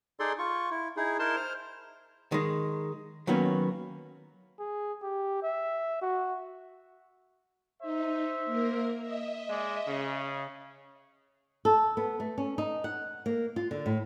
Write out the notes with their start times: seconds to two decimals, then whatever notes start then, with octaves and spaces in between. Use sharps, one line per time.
0.20 D#4 G#4 A4 D5 C6
0.39 F4 C#6
0.71 E4
0.97 D#4 E4 G#4
1.19 D#4 E4 A#4 A5 C6
1.36 C5 F6
2.32 D#3 G#3
3.27 D#3 F#3 A#3 B3 C#4
4.59 G#4
5.03 G4
5.43 E5
6.02 F#4
7.82 D#4 C5 E5
8.45 A#3 A#4
9.01 D#5 E5
9.50 G#3 D5
9.88 C#3
11.65 A4
11.97 B3
12.20 A3
12.38 C#4
12.58 D#4
12.84 F#5
13.26 A#3
13.56 F4
13.71 D3
13.86 A2